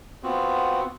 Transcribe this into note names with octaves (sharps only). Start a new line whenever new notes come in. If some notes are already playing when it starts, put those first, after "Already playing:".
B3 C4 F4 F#4